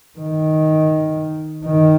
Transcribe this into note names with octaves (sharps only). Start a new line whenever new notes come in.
D#3
D#3